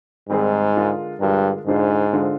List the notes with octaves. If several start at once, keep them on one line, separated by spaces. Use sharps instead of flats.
G#2 D#3 G3 C4 D#4 G#4
D3 G#3 D4 F4 A#4
G2 D3 G#3 D4 F4 A#4
G#2 D3 G#3 D4 F4 C5
D3 G#3 D4 F4 C5